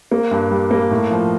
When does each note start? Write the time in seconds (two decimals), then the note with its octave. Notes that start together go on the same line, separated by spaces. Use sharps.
0.11 A#3
0.31 G2
0.51 G3
0.71 A#3
0.91 A2
1.11 F3